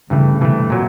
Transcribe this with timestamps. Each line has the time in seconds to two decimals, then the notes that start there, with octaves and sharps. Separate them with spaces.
0.10 G2 C#3 E3 A3
0.41 G2 C3 E3 A3
0.70 A#2 F#3